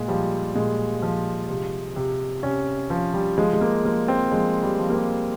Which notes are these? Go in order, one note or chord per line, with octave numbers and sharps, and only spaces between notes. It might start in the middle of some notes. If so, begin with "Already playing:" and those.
Already playing: A#2 G#3
F3 G3
A#2 G#3
F3
C3
C3
C3 C#4
F3
G3
F3 G#3
G#3
A#3
F3 A#3
C4
F3 G#3
G3
F3
A#3
C4